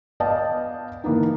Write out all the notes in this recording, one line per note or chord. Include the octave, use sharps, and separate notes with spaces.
B3 D5 D#5 F5 G5 A5
D#3 E3 A#3 B3 D#4